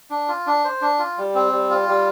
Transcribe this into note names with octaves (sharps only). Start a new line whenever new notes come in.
D4
F4
D4
C5
D4
F4
G3
C4
G3
F4
G3